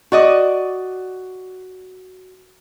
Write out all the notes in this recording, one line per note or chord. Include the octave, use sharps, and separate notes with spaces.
F#4 D5 D#5